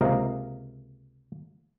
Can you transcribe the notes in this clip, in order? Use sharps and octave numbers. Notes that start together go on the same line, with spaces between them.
C#2 C3 A#3 D#5 F5 A#5